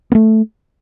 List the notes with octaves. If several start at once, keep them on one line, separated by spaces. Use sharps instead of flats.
B3
A3